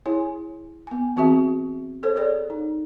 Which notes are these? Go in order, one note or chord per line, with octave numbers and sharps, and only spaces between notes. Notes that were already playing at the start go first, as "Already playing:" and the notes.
E4 G#4 C#5 G#5
B3 G#5
E3 C4 F#4 G#4 E5
G#4 A4 C5 C#5
G#4 A#4 C#5 D5
D#4